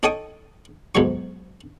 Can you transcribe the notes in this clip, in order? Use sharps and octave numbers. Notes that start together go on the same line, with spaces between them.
D#4 A4 C#5 G5 C#6 D#6
B1 G#2 F3 F#3 C#6